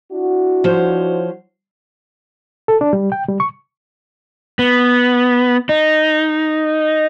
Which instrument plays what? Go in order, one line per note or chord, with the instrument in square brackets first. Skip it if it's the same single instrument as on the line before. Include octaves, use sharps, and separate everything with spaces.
[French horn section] D4 E4 F#4
[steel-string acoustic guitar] F3 C5 C#5
[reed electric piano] A4
D4
G3
G5
G3
C#6
[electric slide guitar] B3
D#4